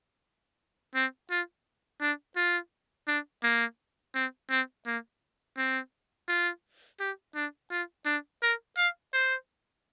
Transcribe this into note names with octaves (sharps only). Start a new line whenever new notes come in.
C4
F4
D4
F4
D4
A#3
C4
C4
A#3
C4
F4
G4
D4
F4
D4
A#4
F5
C5